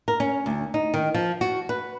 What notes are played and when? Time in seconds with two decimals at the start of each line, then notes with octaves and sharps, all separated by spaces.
0.08 A#4
0.20 C#4
0.46 D2
0.74 D#4
0.94 D#3
1.14 F3
1.41 F#4
1.69 B4